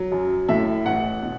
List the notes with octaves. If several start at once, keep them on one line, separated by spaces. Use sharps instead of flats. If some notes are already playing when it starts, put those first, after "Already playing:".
Already playing: F#3
F#2
A2 E5
A1 F#5
B2